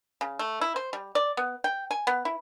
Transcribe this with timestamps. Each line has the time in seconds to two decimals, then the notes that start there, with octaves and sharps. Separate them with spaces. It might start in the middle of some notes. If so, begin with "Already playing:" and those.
0.21 C#3
0.39 A3
0.61 E4
0.76 C5
0.93 G3
1.15 D5
1.37 B3
1.64 G5
1.91 G#5
2.07 B3
2.25 E4